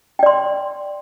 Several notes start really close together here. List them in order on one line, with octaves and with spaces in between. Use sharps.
G5 D5 C6